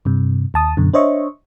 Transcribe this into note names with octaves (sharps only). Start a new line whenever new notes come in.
G2 C3
D#2 A5 D#6
F#2 B2 D3
D4 C5 C#5 D#5 E5 C#6